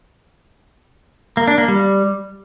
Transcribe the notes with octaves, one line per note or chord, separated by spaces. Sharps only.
A#3
D4
A#3
G3